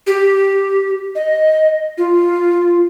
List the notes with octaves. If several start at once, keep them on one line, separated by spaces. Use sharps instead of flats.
G4
D#5
F4